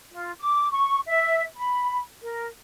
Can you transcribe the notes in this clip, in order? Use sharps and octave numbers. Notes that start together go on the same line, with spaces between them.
F4
D6
C#6
E5
B5
A#4